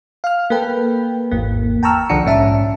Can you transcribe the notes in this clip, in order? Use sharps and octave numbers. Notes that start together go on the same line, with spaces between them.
F5 F6
A#3 A4 B4 G5
G#1 E2 A#3
G5 A5 A#5 C#6 E6 F6
C2 D3 F3 D4 F#5 C#7
A#1 G#2 C#4 E5 A5